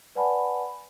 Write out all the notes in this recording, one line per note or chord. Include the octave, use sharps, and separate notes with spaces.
B4 D5 F#5 G#5 A5 B5